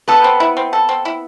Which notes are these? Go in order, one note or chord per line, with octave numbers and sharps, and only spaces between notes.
B3 A4 B4
C4
E4
C4
A4
C4
E4